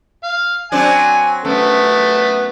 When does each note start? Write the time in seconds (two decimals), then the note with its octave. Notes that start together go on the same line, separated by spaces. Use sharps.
0.24 F5
0.72 F#3 C4 D4 G#5
1.45 F#2 A3 B3 A4